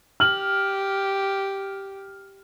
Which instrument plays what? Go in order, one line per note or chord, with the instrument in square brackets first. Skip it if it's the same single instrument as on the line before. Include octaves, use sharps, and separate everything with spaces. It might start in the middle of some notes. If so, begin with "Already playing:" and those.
[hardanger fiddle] G4 [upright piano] F6 F#7